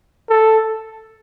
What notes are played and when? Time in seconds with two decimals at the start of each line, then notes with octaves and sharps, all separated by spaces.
0.30 A4